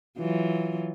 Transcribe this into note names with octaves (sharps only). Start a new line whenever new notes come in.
E3 F#3 F4